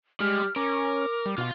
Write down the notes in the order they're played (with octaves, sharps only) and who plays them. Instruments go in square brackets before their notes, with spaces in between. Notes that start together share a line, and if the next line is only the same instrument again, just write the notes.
[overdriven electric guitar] G3 [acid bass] G#3 [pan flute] F6
[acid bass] C#4 [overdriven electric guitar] A#4 [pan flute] D6
[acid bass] G3
[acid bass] B2 [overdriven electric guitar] F4 F5